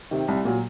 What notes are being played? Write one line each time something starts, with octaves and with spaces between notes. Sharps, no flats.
C3 D#3
C2
A#2 F#3